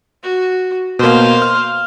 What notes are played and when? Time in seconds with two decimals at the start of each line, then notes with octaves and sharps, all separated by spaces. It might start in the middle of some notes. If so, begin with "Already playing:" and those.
0.23 F#4
0.99 B2 A#3 C5 F5
1.42 F6